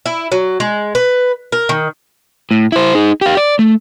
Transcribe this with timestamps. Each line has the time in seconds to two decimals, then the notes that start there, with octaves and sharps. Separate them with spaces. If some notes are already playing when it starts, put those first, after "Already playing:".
0.06 E4
0.32 F#3
0.60 G#3
0.95 B4
1.52 A#4
1.69 D#3
2.51 A2
2.72 E4 C5
2.95 D#4 G#4
3.21 G4 F5
3.37 D5
3.59 A3